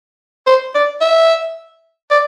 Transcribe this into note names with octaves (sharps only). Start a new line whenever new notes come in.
C5
D5
E5
D5